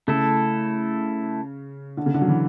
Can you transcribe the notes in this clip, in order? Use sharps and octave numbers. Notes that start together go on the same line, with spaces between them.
C#3 A3 E4 A4
D3
C#3
D3
F#3
E3